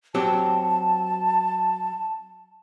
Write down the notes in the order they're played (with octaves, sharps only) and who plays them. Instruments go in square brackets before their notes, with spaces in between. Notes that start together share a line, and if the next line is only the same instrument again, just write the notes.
[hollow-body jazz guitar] F#3 C4 G4 [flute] A5